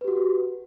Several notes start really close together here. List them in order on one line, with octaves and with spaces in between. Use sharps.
B4 G4 F#4